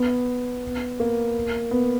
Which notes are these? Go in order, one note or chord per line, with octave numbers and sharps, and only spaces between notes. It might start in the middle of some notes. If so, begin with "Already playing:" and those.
Already playing: B3
A#3
B3